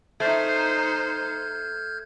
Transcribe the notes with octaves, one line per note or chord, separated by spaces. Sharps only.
A3 D#4 C5 F6 G6 G#6